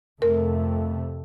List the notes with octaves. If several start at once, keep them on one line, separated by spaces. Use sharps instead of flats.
F2 C3 A3 A#4